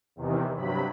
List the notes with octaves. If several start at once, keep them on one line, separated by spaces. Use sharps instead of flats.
E2 C3 D#3 E3
G2 C3 F#3 B5